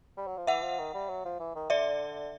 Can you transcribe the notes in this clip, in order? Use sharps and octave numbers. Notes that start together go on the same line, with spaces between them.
G3
F#3
F3
E3 E5 F#5
F3
D#3
G3
F#3
F3
E3
D#3
D3 D5 E5